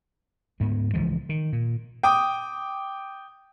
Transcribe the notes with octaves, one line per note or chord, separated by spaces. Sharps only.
D2 G#2 B3
C#2 E3 F3 G#3
D#3
A#2
G5 D6 D#6